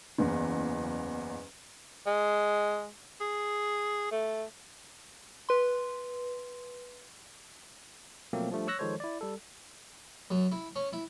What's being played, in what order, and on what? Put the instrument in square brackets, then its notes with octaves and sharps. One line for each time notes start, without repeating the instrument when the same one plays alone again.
[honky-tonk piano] F#1 E2
[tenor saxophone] G#3
G#4
A3
[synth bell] B4 C6
[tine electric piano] B2 F3 F#3 A3 A#3 C4
F3 G3 A3 D4
C#5 C#6 E6 F#6 A#6
D#3 F3 G#3 A4 C5 C#5
E4 D5
G3 A4
[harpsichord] F#2
E4
C#4
E4